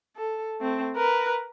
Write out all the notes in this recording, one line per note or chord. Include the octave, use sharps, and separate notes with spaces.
A4
A3 C4
A#4 B4